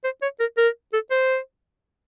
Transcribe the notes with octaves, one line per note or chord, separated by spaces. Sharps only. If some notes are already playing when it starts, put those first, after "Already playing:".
C5
C#5
A#4
A#4
A4
C5